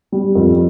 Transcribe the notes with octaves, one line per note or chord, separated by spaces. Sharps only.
G3
F2